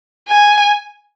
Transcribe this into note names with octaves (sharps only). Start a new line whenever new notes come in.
G#5